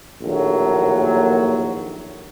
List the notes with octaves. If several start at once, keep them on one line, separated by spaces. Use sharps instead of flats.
A#1 D#2 A2 F#3